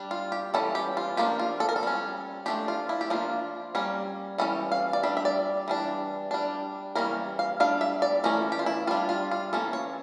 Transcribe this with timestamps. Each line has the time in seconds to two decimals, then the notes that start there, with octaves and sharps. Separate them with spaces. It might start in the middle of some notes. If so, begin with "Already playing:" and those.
Already playing: G3 D4
0.11 F4
0.32 G4
0.54 E3 G3 C#4 A4
0.75 G4
0.97 F4
1.17 F3 A#3 D4 G4
1.39 F4
1.60 A4
1.69 A#4
1.76 A4
1.83 G3 C#4
2.46 F3 A3 D4 G4
2.68 F4
2.89 E4
3.01 G4
3.10 F3 A#3 D4 F4
3.75 G3 A#3 C#4
4.38 E3 G3 C#4 A4
4.72 F5
4.93 D5
5.03 G3 D4 E5
5.17 E5
5.25 D5
5.68 E3 G3 D4
6.31 G3 D4
6.95 E3 G3 A#3 C#4 A#4
7.39 F5
7.60 G3 D4 F5
7.81 E5
8.02 D5
8.24 E3 A3 C#4 A#4
8.52 G4
8.59 F4
8.66 E4
8.87 G3 D4 F4
9.09 F4
9.31 F4
9.53 E3 A#3 C#4 A4
9.73 C#5